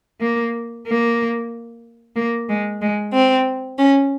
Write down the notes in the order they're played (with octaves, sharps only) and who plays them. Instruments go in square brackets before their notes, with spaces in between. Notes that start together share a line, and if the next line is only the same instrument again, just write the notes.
[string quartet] A#3
A#3
A#3
G#3
G#3
C4
C#4